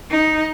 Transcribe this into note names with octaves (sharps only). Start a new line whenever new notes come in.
D#4